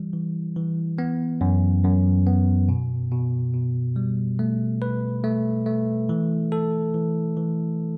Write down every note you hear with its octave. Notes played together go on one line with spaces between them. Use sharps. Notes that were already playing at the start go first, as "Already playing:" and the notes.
Already playing: E3 G3
E3
E3
B3
F#2
F#2
B3
B2
B2
B2
G3
A3
B4
A3
A3
E3
A4
E3
E3